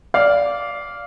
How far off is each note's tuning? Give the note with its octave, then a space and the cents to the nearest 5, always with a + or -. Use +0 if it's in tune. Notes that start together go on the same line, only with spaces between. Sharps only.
D5 -15 F5 +0